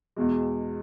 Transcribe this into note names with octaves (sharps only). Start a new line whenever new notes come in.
E2 B2 G#3